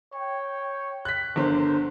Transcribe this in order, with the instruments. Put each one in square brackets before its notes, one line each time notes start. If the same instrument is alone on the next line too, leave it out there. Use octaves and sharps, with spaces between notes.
[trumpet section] C#5 G5
[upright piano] F#6 B6
[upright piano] G1 D3 [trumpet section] A#4 C5